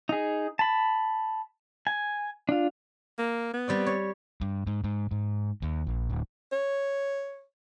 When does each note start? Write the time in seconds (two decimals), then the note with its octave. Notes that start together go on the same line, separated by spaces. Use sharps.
0.09 D#4 G#4
0.59 A5 B5
1.87 G#5
2.49 D4 F4
3.18 A#3
3.54 B3
3.68 G3 C4 D5
3.86 C#5
4.41 G2
4.67 G#2
4.84 G#2
5.11 G#2
5.62 D#2
5.87 A#1
6.10 D1
6.52 C#5